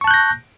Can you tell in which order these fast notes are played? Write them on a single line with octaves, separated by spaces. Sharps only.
C#6 A5 F#6 G6 A#6